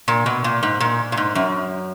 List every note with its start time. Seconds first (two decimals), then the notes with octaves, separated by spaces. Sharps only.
0.08 A#2
0.26 B2
0.44 A#2
0.63 G#2
0.80 A#2
1.12 A#2
1.17 G#2
1.35 F#2